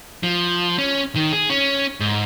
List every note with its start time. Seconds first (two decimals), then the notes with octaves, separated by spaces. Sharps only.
0.23 F3
0.78 C#4
1.16 D#3
1.32 G#4
1.50 C#4
2.00 G#2